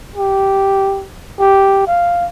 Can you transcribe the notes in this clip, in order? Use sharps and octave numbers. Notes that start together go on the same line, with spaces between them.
G4
G4
F5